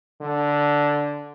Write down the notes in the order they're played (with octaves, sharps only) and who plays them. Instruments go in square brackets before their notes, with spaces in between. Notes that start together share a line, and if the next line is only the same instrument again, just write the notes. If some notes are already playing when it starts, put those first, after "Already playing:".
[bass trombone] D3